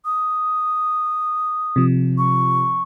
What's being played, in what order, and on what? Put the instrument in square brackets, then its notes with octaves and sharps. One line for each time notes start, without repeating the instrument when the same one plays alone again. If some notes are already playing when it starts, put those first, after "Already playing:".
[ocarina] D#6
[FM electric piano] C3 F3
[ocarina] C#6